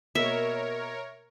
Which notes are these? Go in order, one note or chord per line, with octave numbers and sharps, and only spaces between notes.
B2 A#3 A#4 C#5 E5